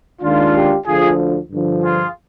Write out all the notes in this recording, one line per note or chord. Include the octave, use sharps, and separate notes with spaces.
D#2 D#3 G#3 D4 F4
G4
D2 D3 F3 F4 G#4
G2 D3 F3
F4 G#4